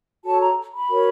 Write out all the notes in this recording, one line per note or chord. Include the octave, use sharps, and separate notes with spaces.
F#4 A4 C#5 A5
A#5
B5
F#4 A#4 C#5